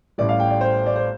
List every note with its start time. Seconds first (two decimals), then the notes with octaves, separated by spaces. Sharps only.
0.18 A1 A2 G3 D5
0.29 F5
0.40 G5
0.50 D5
0.61 C5
0.86 D5
0.96 C5